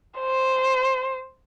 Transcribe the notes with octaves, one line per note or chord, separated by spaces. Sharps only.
C5